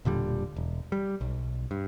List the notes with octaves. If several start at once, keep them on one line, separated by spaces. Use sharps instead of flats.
E1 A#2 D3 G3
E1
G3
B1
G2